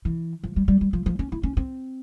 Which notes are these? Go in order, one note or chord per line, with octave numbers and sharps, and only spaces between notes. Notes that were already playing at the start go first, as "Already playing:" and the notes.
E3
F3
G3
G3
G3
F3
F3
C#4
E4
C#4
C4